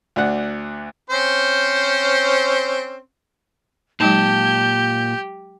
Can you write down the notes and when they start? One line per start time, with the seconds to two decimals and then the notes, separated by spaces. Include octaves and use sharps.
0.16 D2 D4 F#5
1.10 C4 C#4 C5
4.00 A#2 F#3 G#3 D#4 G4 A5 G6